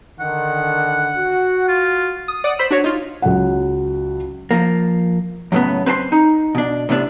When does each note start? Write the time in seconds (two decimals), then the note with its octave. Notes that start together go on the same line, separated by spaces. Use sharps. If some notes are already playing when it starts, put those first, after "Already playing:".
0.20 D3 D#3 F#5
1.18 F#4
1.68 F4
2.28 D#6
2.44 D5 F#5 D#6
2.59 C5 B5 E6
2.71 D4 F#4 C#5
2.84 D#4 F4
3.22 C#2 F#3 F#5
4.51 F3 A#3
5.52 F#2 A2 C#3 B3
5.86 C4 B4 A5 C6
6.12 D#4
6.55 B2 D4
6.89 A2 C3 B3 D4